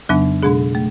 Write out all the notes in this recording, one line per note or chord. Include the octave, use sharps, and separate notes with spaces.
F2 C#3 F#3 B3 D4
B2 G#3 D4 G#4
A3